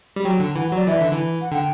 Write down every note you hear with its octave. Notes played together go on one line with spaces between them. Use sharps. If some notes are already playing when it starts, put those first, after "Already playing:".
G3
F#3 G5
D3
E3 F#5
F#3 D5
E3 E5
D3
E3
F#5
D3 G5